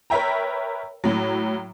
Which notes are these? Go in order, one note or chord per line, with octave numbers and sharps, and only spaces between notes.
A#4 B4 C#5 E5 G5 A#5
A2 F#3